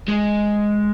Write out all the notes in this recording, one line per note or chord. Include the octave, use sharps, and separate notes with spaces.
G#3